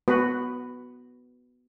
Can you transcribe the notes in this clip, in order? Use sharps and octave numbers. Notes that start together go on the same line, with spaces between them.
B3 F#4 B4